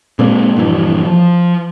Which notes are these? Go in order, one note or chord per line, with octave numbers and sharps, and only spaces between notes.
A#2 G#3 A#3 C4
A#1 G2 E3
F3